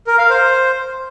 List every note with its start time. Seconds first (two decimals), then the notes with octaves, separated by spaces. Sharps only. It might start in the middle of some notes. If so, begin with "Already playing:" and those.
0.07 A#4
0.18 F5
0.30 C5